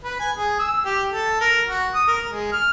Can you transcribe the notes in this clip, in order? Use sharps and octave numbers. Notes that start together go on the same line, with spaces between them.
B4
G#5
G#4
E6
G4
A4
A#4
F#4
D#6
A#4
G#3
F6